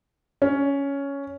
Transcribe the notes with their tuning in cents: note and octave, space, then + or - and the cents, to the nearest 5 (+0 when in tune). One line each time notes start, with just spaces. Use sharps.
C#4 +10